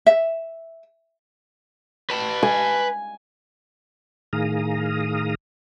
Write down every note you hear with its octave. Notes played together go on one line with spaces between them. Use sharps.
E5
B4 A5
G#5
A2 D#3 G#4 F5 A#5 D#6